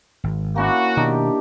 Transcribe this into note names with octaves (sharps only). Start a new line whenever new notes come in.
G#1
A#3 C#4 E4 F#4
B2 D#3 D4 D#4 G4